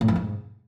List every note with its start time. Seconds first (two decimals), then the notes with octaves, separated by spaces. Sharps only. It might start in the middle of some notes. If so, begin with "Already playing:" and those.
0.01 A2
0.08 F2
0.16 G#2